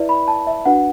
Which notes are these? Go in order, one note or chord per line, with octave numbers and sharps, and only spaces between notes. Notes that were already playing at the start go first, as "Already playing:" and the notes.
Already playing: E4 B4 D5 E5
B5
A5
E5
D4 F#4 B4 F#5